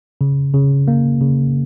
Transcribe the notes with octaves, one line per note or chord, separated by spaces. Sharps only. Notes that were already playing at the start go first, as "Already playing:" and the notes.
C#3
C#3
A#3
C#3